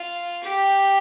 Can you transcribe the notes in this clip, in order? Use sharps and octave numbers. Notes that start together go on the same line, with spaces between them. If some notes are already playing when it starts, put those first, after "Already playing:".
Already playing: F4
G4